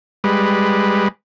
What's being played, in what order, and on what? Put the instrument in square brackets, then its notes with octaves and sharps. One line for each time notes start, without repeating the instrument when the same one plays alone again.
[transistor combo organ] G3 G#3 B4